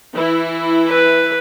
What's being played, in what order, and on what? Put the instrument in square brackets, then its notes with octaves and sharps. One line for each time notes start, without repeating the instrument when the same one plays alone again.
[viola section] E3 E4
[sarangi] B4